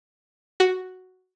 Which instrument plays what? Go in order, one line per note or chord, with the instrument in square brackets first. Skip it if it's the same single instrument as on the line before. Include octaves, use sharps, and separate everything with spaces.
[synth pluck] F#4